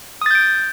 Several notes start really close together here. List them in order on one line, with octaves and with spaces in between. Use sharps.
D#6 A6 G6 D7